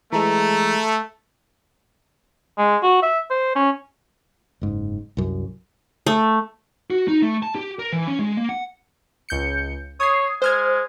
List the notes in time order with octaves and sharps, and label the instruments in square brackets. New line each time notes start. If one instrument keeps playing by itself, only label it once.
[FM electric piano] E3 G#3 [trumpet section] A3 [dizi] A#5
[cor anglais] G#3
F#4
E5
C5
C#4
[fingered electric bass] F#1 G#2
C2 F#2
[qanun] A3
[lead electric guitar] F#4
D#4
A3
A5
G4
A#4
E3
C#4
G#3
A#3
F#5
[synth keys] C#2 G6 C#7
[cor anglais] C#5 [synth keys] D#6 G#6 C7
[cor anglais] G#3 [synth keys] C5 F6 G#6